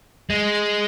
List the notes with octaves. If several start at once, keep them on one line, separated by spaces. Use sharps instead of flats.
G#3